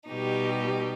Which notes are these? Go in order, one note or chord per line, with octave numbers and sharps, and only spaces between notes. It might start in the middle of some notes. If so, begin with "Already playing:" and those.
B2 G3 D#4 G4